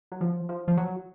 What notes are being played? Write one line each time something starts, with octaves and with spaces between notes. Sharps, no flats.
F#3
F3
F3
F3
F#3